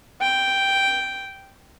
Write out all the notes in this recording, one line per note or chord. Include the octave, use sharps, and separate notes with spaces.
G5